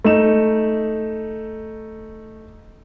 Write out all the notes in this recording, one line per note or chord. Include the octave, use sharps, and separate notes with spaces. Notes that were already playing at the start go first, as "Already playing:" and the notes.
A3 D#4 E7